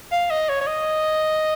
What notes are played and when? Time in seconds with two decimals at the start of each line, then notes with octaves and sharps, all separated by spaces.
0.12 F5
0.31 D#5
0.49 C#5
0.61 C#5
0.67 D#5